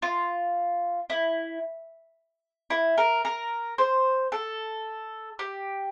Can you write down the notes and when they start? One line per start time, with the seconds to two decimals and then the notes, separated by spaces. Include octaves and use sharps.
0.02 F4
1.10 E4
2.70 E4
2.98 A#4
3.25 A#4
3.78 C5
4.32 A4
5.39 G4